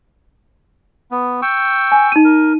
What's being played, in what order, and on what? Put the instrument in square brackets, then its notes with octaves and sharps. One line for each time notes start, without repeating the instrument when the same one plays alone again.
[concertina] B3
G5 C#6 E6
[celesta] G#5
D#4 D#7
[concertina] A#4